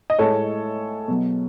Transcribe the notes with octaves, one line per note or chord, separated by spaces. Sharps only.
D#5
A2 G#3 A4 C#5
B2 F#3